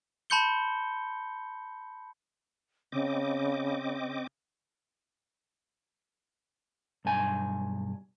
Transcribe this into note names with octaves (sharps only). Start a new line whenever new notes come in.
A5 B5 C6 G6 C#7 G7
C#3 C4 D#5 D6
B1 G2 G#5